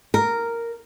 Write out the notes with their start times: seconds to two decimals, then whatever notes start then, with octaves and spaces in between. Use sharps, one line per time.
0.14 A#4